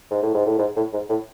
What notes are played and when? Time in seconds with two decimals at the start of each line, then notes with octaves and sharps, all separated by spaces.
0.11 G#2
0.22 A2
0.34 G#2
0.46 A2
0.59 G#2
0.77 A2
0.93 G#2
1.09 A2